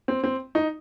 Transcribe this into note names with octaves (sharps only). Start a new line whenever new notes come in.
C4
C4
D#4